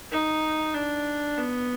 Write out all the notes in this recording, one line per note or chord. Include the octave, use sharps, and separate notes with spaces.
D#4
D4
B3